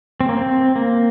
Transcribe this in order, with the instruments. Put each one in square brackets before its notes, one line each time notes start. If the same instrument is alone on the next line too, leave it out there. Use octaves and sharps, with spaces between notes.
[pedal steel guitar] C4
A#3
C4
A#3